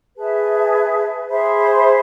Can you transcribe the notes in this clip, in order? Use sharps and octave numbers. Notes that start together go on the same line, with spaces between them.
G#4 B4 E5 A5
G#4 C5 E5 B5